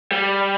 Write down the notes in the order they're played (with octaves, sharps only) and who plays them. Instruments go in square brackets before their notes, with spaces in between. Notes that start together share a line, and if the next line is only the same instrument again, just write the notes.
[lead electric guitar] G3